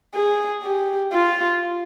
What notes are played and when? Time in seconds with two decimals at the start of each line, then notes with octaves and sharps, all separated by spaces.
0.15 G#4
0.63 G4
1.12 F4